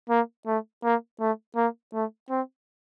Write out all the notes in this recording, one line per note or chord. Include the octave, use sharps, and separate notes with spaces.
A#3
A3
A#3
A3
A#3
A3
C4